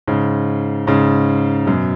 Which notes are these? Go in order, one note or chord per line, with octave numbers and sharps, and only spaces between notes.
G#2 C#3
G#2 C#3
F#2 B2